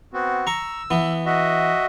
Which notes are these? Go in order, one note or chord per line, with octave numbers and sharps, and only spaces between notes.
B3 C4 F#4
A#5 C#6 E6
E3 B3
F#4 D#5 E5